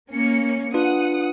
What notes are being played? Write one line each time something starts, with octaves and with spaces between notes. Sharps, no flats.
A#3 C#4 C#7
D4 F4 B4 F#5 D#6